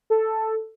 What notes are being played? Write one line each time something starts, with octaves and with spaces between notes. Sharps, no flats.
A4